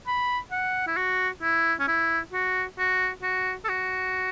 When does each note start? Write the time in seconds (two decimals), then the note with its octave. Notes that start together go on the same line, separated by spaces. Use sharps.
0.07 B5
0.51 F#5
0.87 E4
0.97 F#4
1.42 E4
1.80 C#4
1.88 E4
2.33 F#4
2.78 F#4
3.22 F#4
3.64 A4
3.69 F#4